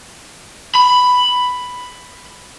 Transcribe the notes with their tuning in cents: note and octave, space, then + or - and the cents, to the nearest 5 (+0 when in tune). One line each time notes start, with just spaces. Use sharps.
B5 +5